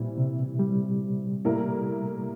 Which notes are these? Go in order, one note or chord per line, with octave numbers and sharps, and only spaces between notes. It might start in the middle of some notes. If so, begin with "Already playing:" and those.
Already playing: A#2 E3 G3 C4 E4
C3
G3
A2 G3 A#3 E4 A#4